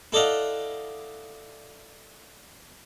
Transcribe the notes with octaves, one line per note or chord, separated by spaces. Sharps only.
E4 A4 D5 D#5 F5 F#5